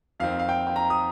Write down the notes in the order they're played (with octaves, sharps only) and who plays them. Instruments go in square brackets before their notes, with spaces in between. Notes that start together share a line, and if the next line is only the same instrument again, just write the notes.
[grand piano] F2 D#3 C4 F5
F5
G5
G5
A#5
D#6